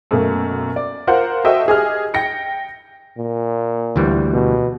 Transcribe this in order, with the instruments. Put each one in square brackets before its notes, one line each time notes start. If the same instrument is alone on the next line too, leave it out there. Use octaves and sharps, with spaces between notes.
[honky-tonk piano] F#2 B2 A3 A#3
D5
F4 A#4 C5 F#5
F#4 A4 C5 D#5 E5 G5
G4 G#4 D#5 F6
G5 A#6 C#7
[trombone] A#2
[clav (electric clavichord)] D2 E3 G3
[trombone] B2